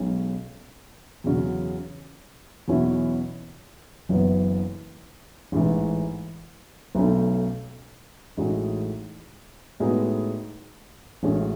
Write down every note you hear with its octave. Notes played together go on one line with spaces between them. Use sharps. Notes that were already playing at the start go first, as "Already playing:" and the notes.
Already playing: B1 B2 G#3 C#4
E2 C#3 F#3
E2 B2 F#3 C#4 E4
F#1 F#2 E3 B3
A1 G#2 E3
B1 B2 A3 C#4
A1 A2 G#3 D#4 F#4
A2 G#3 B3 D#4 F#4
A1 A2 G#3 C#4 F#4